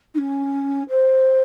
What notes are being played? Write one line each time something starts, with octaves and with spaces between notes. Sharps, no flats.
D#4
C#4
C5